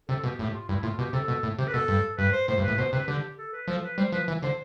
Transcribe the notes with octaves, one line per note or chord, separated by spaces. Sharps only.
C3 A4
B2 G4
A2 G4
F4
G2 E4
A2 F4
B2 G4
C3 A4
B2
A2
C3 G4
B4
B2 A4
G2
G2 B4
C5
A2 C5
G2
A2 B4
B2 C5
C3 B4
D3 G4
A4
B4
F3 A4
B4
G3 C5
F3 B4
E3
D3 C5